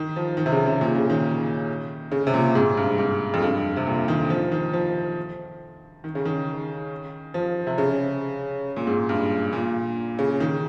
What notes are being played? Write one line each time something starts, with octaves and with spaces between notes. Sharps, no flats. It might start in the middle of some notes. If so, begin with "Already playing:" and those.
Already playing: D#3
F3
D#3
C3
C#3
C3
A#2
C#3
D#3
C#3
C3
A#2
G#2
G2
G#2
F2
G2
C3
A#2
D#3
F3
D#3
F3
D#3
C#3
D#3
F3
C3
C#3
A#2
G#2
G2
A#2
C#3
D#3